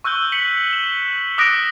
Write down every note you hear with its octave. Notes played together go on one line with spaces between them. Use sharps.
C#6 E6 F#6 G6 G7
B6 C#7 F#7
E7 G7
D6 D#6 F#6 A#6 D7